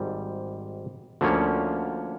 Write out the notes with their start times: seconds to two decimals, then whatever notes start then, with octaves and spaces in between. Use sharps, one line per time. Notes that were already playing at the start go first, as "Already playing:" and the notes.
Already playing: G#1 G#2 G3
1.21 D2 D3 F3 A#3 C#4